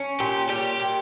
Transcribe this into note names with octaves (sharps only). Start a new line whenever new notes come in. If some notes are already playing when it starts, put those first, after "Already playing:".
Already playing: C#4
A#2 G4
G3 G4
A#2